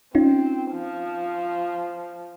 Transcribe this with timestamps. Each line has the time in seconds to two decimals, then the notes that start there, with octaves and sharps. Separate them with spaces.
0.15 C4 C#4 D#4 F4
0.73 F3